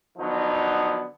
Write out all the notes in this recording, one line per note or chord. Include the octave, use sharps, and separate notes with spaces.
D3 F3 F#3 B3 D#4